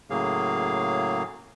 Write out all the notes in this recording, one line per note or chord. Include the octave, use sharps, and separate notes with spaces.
A2 C#3 F#3 A#3 G#4 F5